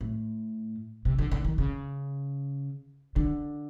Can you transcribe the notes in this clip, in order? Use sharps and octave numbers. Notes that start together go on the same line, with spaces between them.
A2
C3
D3
D3
D#3
C#3
D3